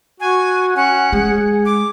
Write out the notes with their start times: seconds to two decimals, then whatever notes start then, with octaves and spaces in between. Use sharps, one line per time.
0.20 F#4 G#5
0.76 C#4 F#5
1.13 G#3 G#4
1.66 D6